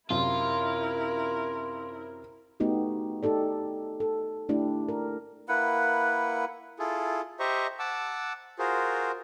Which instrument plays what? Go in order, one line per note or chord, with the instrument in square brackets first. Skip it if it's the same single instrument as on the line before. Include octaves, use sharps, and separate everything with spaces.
[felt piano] F#2 C3 [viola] E4 A#4 [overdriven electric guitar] F4
[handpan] A3 B3 D#4 F#4 G4
D#4 G4 A4 D5
A4
A3 D4 E4 G4
A#4
[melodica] A#3 E4 B4 F#5
[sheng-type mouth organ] E4 F4 G#4 A4
G4 C5 D#5 E5 A#5 C#6
F#5 A5 D6 E6
F4 F#4 G#4 A#4 C5